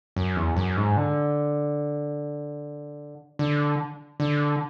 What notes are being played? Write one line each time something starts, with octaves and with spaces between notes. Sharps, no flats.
F#2
E2
F#2
G#2
D3
D3
D3